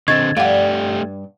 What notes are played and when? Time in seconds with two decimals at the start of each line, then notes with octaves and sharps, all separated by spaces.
0.08 D3 C4 D#5 C#6 G#6 A6
0.37 G2 A3 G4 D5 F5 F#5